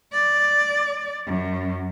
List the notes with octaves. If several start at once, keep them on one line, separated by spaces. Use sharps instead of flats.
D5
F#2